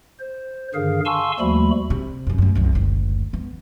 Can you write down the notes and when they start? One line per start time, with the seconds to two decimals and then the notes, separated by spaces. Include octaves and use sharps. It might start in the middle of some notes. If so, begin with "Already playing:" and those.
0.20 C5
0.74 G2 D3 D#3 G#4 A#4 F5
1.05 F5 G#5 A5 C6 C#6 E6
1.40 D#2 F3 G3 A3 F#4 B5
1.90 C3
2.27 F1 F#2
2.38 F#2 A3
2.55 C2 F#2
2.73 F#1 D2
3.33 E3 B3